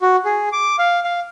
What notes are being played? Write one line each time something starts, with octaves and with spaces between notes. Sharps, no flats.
F#4
G#4
D6
F5
F5